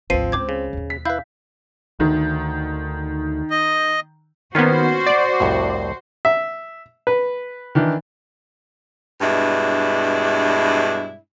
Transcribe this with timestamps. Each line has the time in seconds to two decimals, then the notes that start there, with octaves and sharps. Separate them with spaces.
0.10 G#1 D2 F3 C4 C7 D#7
0.32 C#2 C5 D6 G#6
0.49 C#3
0.73 D#2 B2
0.90 B6
1.05 E4 B4 F5 G6
2.00 D2 D#3
3.51 D#5
4.55 D#3 A#3 B3 C#4 F4 F#4 C5
5.06 D5
5.40 C2 F2 A2
6.25 E5
7.07 B4
7.75 D#3 E3 D4
9.21 G2 B2 G#3 D4 E4